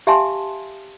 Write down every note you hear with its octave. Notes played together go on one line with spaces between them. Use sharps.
G4 E5 F5 G#5 A5 C6